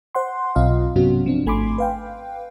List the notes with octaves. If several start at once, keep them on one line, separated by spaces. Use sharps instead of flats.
C5 F#5 C6
B1 C4 F4 D#5 F5
G2 C3 F#3 B3 C#4 F#4
F3 C4 D4
G#1 A3 G#5 B5 C6 D6
B4 F5 G5